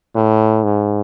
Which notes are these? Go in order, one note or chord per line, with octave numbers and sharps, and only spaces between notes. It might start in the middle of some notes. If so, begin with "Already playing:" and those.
A2
G#2